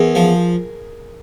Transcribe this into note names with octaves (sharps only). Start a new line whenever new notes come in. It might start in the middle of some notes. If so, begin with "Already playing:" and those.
Already playing: E2 G#4 A#4
F3